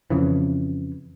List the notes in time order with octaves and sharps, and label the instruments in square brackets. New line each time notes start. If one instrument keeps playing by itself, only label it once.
[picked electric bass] F2 C#3 E3